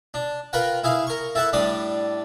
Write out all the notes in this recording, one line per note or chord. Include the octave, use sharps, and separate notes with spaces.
D4
F4 A#4 B4 F#5 G5
E4 G#4 F5
A#4 C#6
E4 A4 E5 F#5
A2 G3 D4 D5 D#6